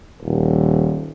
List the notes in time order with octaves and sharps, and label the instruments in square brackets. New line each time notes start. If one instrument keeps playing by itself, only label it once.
[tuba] D#1